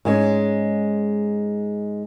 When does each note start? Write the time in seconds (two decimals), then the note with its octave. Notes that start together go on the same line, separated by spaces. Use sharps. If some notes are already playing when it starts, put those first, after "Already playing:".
0.05 G#2 G#3 C#4